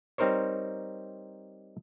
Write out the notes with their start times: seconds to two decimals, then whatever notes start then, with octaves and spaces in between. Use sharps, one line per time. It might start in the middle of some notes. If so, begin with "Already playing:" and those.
0.18 G3 C4 D#4 A#4 C5 C#5